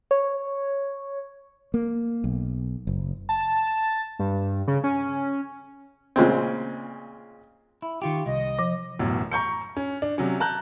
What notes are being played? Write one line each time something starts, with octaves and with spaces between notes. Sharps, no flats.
C#5
A#3
B1
F#1
A5
G2
C#3
C#4
A#2 C#3 G#3 C4
E4
D#3 F4 G4 C#6 D6
C2 D#5
F3
A1 F#2 B2
A#5 C#6 G6 C#7
C#4
D4
C3 F#3 C#4
A5 A#5 F#6 G6